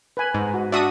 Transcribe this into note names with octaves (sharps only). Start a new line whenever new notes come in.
B4 G#5
G#2
F#4
D4 F#4 E5 D#6